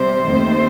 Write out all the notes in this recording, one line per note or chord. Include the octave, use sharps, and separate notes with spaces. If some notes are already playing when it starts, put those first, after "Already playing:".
Already playing: C3 G3 C5
D#2 D#3 A3 C4